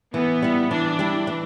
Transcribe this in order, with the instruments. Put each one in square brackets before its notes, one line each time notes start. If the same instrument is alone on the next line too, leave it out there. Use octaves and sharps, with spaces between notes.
[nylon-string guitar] E3 [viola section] B3
[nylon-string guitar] G3 E4
[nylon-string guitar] E3 [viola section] D4
[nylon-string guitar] G3 E4
E3